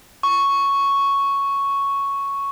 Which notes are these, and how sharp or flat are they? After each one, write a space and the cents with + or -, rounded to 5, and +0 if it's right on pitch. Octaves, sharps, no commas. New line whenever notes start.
C#6 +0